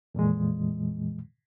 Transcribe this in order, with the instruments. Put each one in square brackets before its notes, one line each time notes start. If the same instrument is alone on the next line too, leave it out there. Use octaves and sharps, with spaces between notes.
[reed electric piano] F2 A#2 E3 G#3